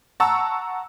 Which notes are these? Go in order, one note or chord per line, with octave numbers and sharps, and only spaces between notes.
F#5 A5 A#5 C#6 E6